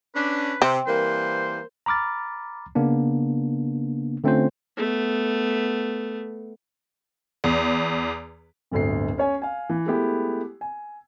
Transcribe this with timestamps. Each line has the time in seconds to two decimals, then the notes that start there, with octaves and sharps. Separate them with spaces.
0.15 C#4 D4 B4
0.62 C3 C4
0.87 E3 G3 A#3 A#4 C5
1.86 A#5 B5 D6 F6 A6
2.75 C#3 A#3 B3 D4
4.24 D3 A3 C4 C#4 F4 C5
4.77 A3 B3
7.44 E2
8.71 D1 G1 D2 D3 A4 C7
9.18 C#4 C#5 G#5
9.42 F5 G#5
9.69 E3
9.86 G#3 A3 B3 E4 G4
10.61 G#5